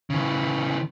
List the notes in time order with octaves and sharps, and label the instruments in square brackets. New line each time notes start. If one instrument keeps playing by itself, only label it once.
[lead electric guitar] C#3 E3